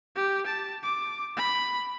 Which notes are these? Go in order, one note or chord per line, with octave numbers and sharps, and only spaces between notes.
G4
A5
D6
B5